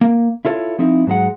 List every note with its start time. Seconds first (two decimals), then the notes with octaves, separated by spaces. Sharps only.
0.01 A#3
0.45 E4 F4 A4 C#5
0.79 F3 C4 D#4 E4
1.07 G#2 F#3 G#3 F#5